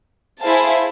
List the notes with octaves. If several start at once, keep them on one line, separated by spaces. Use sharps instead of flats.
E4 G#4 C5 F5 A5